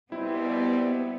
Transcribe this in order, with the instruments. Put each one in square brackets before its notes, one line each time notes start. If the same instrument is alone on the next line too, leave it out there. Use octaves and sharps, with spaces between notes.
[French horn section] B2 G3 [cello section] B3 [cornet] C4 [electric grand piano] E4